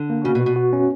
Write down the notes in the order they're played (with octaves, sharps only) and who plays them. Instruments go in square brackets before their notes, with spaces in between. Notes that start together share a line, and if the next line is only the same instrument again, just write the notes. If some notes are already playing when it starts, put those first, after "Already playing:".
Already playing: [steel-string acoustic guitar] D3
[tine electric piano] A#3
[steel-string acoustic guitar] C#3 [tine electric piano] F#4
[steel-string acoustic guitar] B2
[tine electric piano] F#4
[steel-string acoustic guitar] B2
[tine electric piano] F#4
C#4